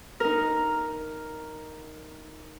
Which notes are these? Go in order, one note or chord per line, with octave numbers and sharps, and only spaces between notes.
D#4 A#4